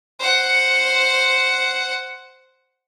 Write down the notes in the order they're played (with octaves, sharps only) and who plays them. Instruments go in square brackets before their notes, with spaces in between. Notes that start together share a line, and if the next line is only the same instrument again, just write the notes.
[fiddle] C5 F#5